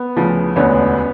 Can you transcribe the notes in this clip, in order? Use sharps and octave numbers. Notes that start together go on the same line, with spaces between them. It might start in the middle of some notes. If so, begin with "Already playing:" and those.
Already playing: B3
D2 C#3 F3
E1 D2 D3 B3 C#4